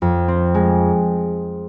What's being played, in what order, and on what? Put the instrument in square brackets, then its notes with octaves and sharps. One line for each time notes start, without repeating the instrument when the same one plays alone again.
[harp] F2
C4
G#3